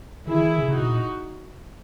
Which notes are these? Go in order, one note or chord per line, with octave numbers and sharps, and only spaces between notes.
D#3 E4 G#4
E3
D#3
C#3
C#3 D#4 F#4
B2
A#2